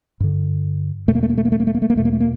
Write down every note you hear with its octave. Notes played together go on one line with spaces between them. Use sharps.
G2 D3
E2 B2 A3
A#3
A3
A#3
A3
A#3
A3
A#3
A3
A#3
A3
A#3
E2 B2 A3
A#3
A3
A#3